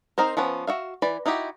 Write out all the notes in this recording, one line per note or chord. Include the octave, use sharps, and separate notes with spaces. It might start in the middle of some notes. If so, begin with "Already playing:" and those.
C4 D#4 A#4 C5
F3 B3 C#4 B4
F#4 E5 F5
E3 D5 B5
D#4 E4 F#4 G4